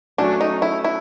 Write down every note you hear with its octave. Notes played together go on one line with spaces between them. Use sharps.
F#3 A3 C#4 D4 F#4
D#4
E4
E4